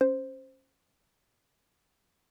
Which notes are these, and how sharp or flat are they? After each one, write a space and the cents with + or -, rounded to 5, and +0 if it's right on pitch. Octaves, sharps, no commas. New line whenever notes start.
C#4 -15 C5 +0